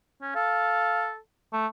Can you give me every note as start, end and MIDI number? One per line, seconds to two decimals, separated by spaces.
0.22 0.32 61
0.35 1.17 69
0.35 1.08 77
1.53 1.67 57